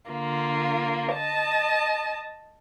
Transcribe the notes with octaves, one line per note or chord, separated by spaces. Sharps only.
D3 A#3 F4
D#5 A5